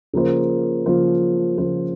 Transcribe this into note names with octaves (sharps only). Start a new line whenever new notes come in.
C#3 F3 A#3 F4 C5
C#3 F3 A#3 F4 C5
C#3 F3 A#3 F4 C5